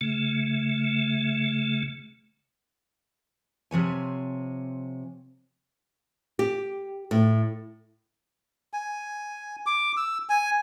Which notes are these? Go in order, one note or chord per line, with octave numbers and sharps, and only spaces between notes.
C#3 A3
C3 F3 C#5 G#5
G4
A2
G#5
D6
E6
G#5